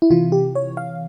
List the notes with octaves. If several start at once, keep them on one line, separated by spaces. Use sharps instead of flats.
E4
C3 E3 F4
G4
C#5
F5